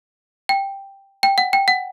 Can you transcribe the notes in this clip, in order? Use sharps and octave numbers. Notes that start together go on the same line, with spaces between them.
G5
G5
F#5
G5
F#5